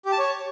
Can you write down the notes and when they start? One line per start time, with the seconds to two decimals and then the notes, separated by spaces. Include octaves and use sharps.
0.06 G4
0.12 A5
0.19 C#5